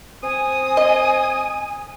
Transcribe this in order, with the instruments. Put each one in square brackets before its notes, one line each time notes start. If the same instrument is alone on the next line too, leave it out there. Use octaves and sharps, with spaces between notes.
[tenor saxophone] C4 [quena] G#5 [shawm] D#6
[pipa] D#5